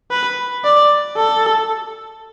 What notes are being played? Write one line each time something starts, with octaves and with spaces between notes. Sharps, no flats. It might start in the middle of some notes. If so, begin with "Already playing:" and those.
B4
D5
A4